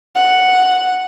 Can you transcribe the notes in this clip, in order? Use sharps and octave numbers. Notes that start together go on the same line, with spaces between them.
F#5